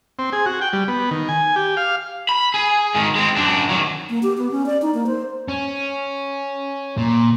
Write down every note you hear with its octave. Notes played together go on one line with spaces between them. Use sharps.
C4
G#4
F#4
G5
G3
B3
D#3
G#5
G4
F5
B5
G#4
G#2 D#3
G#3 C4
F#2 D4
D#3 F#3
A#3
G4
B3
C#4
D5
D#4
A#3
C5
C#4
A#2